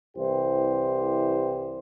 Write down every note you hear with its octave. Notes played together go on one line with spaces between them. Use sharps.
C2 E3 G4 C5